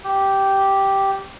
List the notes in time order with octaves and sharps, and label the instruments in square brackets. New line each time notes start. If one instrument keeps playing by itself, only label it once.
[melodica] G4